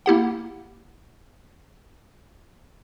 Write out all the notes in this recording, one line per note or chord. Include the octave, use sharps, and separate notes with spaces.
A#3 E4 G4 F#5